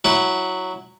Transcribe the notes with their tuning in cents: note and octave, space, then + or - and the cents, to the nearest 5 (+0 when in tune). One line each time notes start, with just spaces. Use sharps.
F#3 +0 E4 -10 F#5 +25